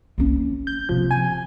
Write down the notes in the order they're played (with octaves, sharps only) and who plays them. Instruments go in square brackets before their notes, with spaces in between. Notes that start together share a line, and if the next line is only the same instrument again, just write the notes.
[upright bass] A#3 C#4
[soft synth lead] G6
[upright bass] C3 [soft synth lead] F3
[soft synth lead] G#5